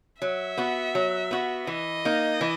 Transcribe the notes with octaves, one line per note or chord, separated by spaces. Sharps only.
F#3 E5
B3 F#4
F#3
B3 F#4
E3 D#5
A#3 D#4
E3